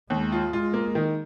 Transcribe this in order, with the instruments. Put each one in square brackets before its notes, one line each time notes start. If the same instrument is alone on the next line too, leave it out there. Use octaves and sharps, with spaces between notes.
[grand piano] D#2 [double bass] G#3
[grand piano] F4
[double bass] G#3 [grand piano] F4
[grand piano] A#3
D#3